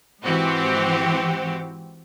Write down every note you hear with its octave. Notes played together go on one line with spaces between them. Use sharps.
G#2 E3 C4 F#4 G4